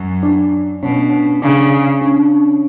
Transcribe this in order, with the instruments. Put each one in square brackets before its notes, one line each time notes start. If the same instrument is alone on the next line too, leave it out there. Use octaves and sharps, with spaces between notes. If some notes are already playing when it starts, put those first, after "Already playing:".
Already playing: [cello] F#2
[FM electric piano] D4
[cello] B2 [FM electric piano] C#4
[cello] C#3 [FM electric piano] D4
[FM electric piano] C#4